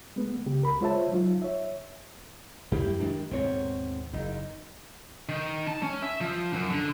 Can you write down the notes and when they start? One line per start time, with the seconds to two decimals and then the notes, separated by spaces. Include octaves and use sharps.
0.16 G#3 A3 B3
0.46 C#3 G4
0.62 C#2 A#4 B5
0.81 G#3 F4 C5 C#5 E5 A5
1.12 F#3 D#4 F4
1.42 C#5 E5
2.72 F#2 A#3 E4 G4
3.00 D#3 G#3 D4
3.31 D#2 G#2 B2 C4 C#5
4.13 F#1 D#4
5.29 D#3
5.67 A5
5.83 C#4
6.02 E5
6.21 F3
6.53 F#2
6.70 D3